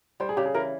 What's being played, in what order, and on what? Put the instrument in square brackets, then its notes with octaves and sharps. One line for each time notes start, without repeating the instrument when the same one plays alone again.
[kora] G3 [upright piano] C5
[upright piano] G#4
[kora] C#3 [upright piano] G4
[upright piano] G#4
[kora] E3 [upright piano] A#4